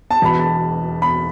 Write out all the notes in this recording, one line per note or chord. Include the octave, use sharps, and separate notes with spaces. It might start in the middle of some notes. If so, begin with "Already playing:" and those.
A5
E1 E2 B2 B5
A5
B5